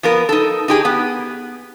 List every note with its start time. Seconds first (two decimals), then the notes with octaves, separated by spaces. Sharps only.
0.03 F3 B3 A#4
0.29 D#4 A4
0.68 D#4 G4 G#4
0.85 B3